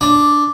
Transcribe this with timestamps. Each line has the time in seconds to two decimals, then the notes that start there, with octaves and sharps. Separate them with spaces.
0.01 D4